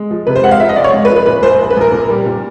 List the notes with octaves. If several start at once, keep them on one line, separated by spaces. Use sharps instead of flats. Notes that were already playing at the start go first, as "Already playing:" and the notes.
Already playing: G#3
F3
C3 B4
C5
G#3 F#5
F5
F3 E5
D#5
G#3 D5
C#5
G#3
B4
F3
B4
A#2 B4
A#1 C5
A#1
B4
A#1 A#4
A#2
G3
A#2